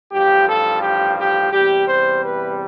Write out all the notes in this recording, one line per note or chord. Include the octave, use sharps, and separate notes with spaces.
A1 G2 F3 G4
A4
G4
G4
E2 C3 G3 G4
C5
B4